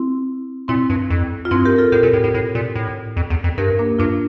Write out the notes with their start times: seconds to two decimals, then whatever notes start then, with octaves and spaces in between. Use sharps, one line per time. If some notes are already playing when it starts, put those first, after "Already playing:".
Already playing: C4 E4
0.68 A#2 C4 E4
0.90 G2
1.10 F2
1.45 F4
1.51 G2 C4 E4
1.65 G4 A#4
1.78 F4 A4
1.92 A2 G4 A#4
2.03 A#2
2.13 A2
2.24 A2
2.34 A2
2.55 A#2
2.75 A2
3.17 F2
3.30 E2
3.44 F2
3.58 G2 G4 A#4
3.79 A#3 D4
3.99 G2 D4 F4